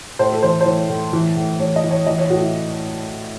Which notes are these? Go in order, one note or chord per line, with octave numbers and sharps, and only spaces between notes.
A2 C5
A4
E3 C5
C5
E3 C#5
A2
E3
A2
E3 C#5
D#5
E3
C#5
E3 D#5
C#5
A2 F#4
E4